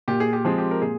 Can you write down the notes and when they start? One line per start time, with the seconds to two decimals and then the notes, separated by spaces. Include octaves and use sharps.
0.08 A#2 G4
0.20 G#4
0.33 G4
0.45 F3 G#3 C4 G#4
0.58 G4
0.71 A#4
0.82 A#2 G#4